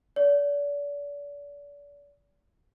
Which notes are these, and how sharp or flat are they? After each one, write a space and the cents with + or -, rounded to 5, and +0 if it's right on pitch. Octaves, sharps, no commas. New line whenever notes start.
D5 -35